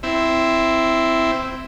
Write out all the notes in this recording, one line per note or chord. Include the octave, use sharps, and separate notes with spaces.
C4 E4